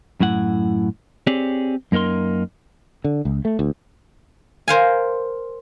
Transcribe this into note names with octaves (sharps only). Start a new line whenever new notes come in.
F#2 A2 E4 F#5
C4 G4 G#4 C#5 D5
F#2 A#3 D#4 A#4 C6
D3
C#2
A3
D2
A#4 C5 F5 G#5